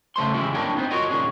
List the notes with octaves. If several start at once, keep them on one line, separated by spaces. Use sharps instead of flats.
C#3 A3 C5 C6
C#3 E3 G#3 E4 F4 G4
A#3 D4 E4 A#4 C#5 G5
B3 C4 D#4 C5
F4 F#4 A#4 C#5 D#5
A#2 D#3 E3 C#4 D4 G#4